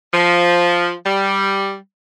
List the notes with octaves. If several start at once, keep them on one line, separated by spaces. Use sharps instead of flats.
F3
G3